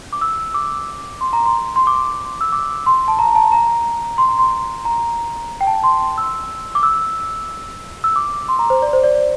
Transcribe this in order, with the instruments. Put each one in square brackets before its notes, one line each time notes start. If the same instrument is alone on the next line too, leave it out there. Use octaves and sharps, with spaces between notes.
[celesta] D6
E6
D6
C6
A#5
C6
C6
D6
E6
D6
C6
A5
A#5
A#5
A5
A#5
C6
A#5
C6
A#5
G5
A5
C6
E6
D6
E6
E6
D6
C6
A#5
C5
D5
C5
D5
D5